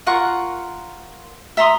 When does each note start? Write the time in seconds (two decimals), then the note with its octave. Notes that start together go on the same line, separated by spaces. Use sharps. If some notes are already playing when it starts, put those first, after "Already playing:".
0.07 F4 A#4 F#5 C#6
1.57 E5 A#5 C6 D#6